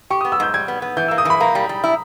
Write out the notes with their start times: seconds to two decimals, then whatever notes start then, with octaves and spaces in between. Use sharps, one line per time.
0.10 G4 C#6
0.21 D#6
0.25 B3
0.32 E6
0.40 G#2 G6
0.54 G3 G#6
0.68 B3
0.82 B3
0.97 E3 G6
1.08 E6
1.11 A#3
1.18 D#6
1.25 E3 B5
1.40 A#3 A#5
1.55 G3
1.69 G3
1.84 E4